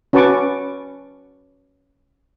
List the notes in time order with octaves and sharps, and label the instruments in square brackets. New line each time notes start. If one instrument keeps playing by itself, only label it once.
[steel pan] C#4 F#4 B4 A5 C#6 D6